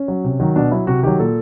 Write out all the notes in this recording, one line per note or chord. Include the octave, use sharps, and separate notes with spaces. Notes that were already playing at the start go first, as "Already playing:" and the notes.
Already playing: C#4
F#3
C3
D#3 F#3
B2 D4
F#3 E4
C3 F#4
D#3 F#3 G4
A#2 A4